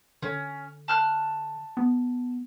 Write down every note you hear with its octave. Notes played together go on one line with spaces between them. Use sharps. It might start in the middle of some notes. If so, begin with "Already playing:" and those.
D3 C#4
A5 F6 F#6
B3